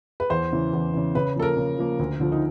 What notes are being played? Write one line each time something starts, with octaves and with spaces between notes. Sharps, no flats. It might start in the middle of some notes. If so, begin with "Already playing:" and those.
B4
E2 C5
C#3 E3
E2
C#3 E3
C#3 B4
F3 A#3 A4
A#4
C#3
F3 A#3
D2
D3 F3
D#4